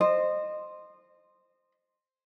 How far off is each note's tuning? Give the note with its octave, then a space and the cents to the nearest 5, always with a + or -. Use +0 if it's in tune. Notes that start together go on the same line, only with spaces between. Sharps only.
C5 +0 D#5 -25